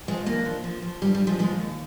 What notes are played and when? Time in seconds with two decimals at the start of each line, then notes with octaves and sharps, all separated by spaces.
0.08 F3 G#3 C4
0.26 D#2 A#3 D4
0.46 F3
0.64 F3
0.82 F3
1.02 G2 G3
1.15 G3
1.21 G2
1.27 F3 G#3
1.39 D#2 F3 G#3
1.58 D#2